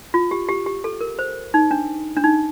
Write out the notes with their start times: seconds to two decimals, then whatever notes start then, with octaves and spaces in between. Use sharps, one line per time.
0.14 F4
0.31 G4
0.49 G4
0.66 G4
0.84 A4
1.01 A#4
1.19 C5
1.54 D#4
1.71 D4
2.17 D4
2.24 D#4